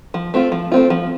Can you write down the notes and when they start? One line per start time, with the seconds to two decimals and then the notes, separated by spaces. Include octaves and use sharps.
0.14 F3
0.34 A3 C4 F4
0.52 F3
0.72 A3 C4 F4
0.90 F3